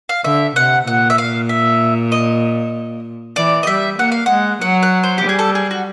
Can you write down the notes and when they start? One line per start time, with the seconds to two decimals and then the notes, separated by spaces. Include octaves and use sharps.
0.09 F5
0.24 D3 E5
0.55 C3 F#5
0.86 A#2 F#5
1.10 E5
1.18 F5
1.49 E5
2.12 D#5
3.36 E3 D5
3.63 D#5
3.67 G3 E5
3.98 A#3 F#5
4.12 F5
4.26 G#3 F#5
4.61 F#3 F#5
4.83 F#5
5.03 C5
5.18 G4
5.24 G3
5.29 G#4
5.39 A4
5.55 G#4
5.71 F#4